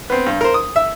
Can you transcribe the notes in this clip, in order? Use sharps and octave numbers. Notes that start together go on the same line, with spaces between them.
B3 C4
G2
A#4 C5
D#6
E5